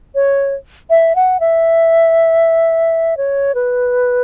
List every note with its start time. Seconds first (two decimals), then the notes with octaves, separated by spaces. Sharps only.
0.15 C#5
0.90 E5
1.16 F#5
1.40 E5
3.17 C#5
3.55 B4